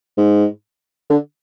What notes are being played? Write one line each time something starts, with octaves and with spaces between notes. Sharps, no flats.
G#2
D3